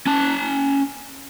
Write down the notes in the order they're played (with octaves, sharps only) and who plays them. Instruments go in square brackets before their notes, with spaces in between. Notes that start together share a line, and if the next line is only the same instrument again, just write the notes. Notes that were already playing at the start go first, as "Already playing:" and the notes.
[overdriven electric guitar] C#4 A5